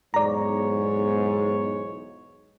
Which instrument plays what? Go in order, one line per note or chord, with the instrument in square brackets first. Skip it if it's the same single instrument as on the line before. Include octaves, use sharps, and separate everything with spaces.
[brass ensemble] B1 E2 C#5 [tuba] G#2 [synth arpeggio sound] D5 A#5